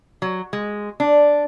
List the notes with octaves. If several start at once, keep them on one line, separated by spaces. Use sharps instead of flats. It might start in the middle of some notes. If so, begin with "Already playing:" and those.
F#3
G#3
D4